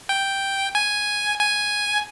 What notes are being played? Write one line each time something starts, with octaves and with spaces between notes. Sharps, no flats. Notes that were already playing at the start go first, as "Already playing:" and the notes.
G5
G#5
G#5